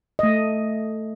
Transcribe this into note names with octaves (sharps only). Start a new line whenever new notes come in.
A3 D#5